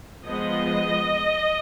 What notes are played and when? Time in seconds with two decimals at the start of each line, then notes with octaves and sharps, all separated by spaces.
0.25 F3 G#3 B3 D#5